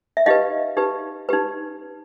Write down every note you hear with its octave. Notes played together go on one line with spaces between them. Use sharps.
E5
D#4 G4 B4 D#5 F5
D#4 G4 B4
D#4 G4 B4